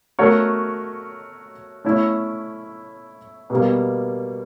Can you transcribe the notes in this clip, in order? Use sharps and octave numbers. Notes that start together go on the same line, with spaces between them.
A3 C#4 F#4 A#4 C#5
A3 C#4 E4
B2 G3 A#3